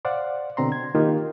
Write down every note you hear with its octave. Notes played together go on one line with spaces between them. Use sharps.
C5 D5 F5 F#5
B2 D3 C4 A#5 C6
G#6
D#3 A#3 D#4 F4 G4